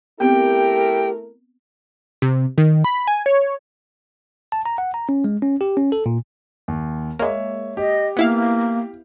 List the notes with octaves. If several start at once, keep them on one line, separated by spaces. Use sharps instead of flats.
A3 B3 C4 E4 G4 A#4 G5
C3
D#3
B5
G#5
C#5
A5
A#5
F#5
A#5
C#4
G#3
C#4
G4
C#4
A4
A#2
D#2
G#3 A#3 C#5 E5
G4 D#5
A#3 B3 E4 F5